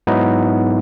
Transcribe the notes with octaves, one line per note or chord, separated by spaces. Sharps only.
G#2 F#3 B3 D#4 E4